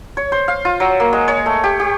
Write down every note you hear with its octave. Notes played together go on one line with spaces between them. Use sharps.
C#5
C5
F5
F4
F#3
A#3
G#3
C#5
A3
G4
G4